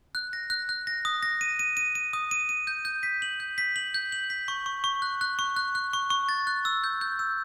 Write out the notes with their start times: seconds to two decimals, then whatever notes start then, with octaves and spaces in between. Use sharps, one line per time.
0.15 F#6
0.33 A#6
0.50 F#6
0.69 F#6
0.87 A#6
1.05 D#6
1.23 A#6
1.41 D#7
1.59 D#7
1.77 D#7
1.95 D#7
2.13 D#6
2.31 D#7
2.49 D#7
2.67 G6
2.85 G6
3.03 B6
3.22 F#7
3.40 G6
3.58 B6
3.76 F#7
3.94 G6
4.12 F#7
4.30 B6
4.48 C#6
4.66 C#6
4.84 C#6
5.02 F#6
5.21 F#6
5.39 C#6
5.56 F#6
5.75 F#6
5.93 C#6
6.10 C#6
6.29 A6
6.47 F#6
6.65 E6
6.84 G6
7.01 G6
7.19 E6